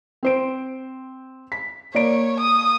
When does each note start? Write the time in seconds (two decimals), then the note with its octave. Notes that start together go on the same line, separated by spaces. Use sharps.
0.23 C4 C5 D7
1.52 B6
1.94 A#3 C#5 D5 D7
2.40 D#6